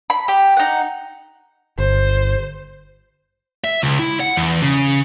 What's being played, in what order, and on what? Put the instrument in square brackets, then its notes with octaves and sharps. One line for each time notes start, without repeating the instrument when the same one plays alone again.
[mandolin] B5
G4
D#4 F#5
[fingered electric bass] G1 [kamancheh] C5
[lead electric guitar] E5
C#2
E4
F#5
E2
C#3